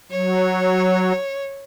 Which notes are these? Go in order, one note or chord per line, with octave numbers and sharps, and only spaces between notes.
F#3 C#5